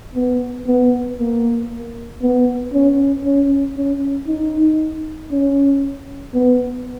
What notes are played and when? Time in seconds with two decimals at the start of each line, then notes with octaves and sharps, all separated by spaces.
0.15 B3
0.67 B3
1.19 A#3
2.22 B3
2.73 C#4
3.25 C#4
3.77 C#4
4.27 D#4
5.31 C#4
6.34 B3